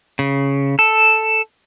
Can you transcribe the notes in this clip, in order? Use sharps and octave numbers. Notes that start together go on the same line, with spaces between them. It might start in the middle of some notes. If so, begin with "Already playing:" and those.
C#3
A4